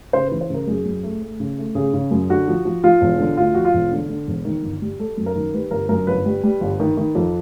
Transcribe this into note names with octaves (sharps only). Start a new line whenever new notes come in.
C#3 C5
E3 B4
C5
C#3 A#4
F#2 G#4
F#2
A3
A3
C#3
A3
C#3 G#4
C#3
F#2
D3 F#4
F3
F3
F3 F4
E1
D3
D2 F4
F3 F#4
F4
E1
D3
D3
E1
D#3
G1
G3
G3 A4
F#2
A#4
D#3
G3 B4
G1 A#4
F#2 A#4
G1 B4
G3
G3
G1
D#3
D#3
F2